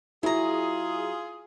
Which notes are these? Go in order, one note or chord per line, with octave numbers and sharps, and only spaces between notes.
F#3 E4 F4 G#4 A#5